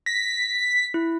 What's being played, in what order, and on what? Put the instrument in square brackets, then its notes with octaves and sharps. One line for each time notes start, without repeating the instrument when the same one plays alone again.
[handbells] A#6 [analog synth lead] B6
[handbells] E4